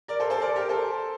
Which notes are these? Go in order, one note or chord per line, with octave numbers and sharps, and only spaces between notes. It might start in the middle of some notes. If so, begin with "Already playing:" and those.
A#4 D5
A4 C5
A4 C5
A#4 D5
G4 A#4
A4 C5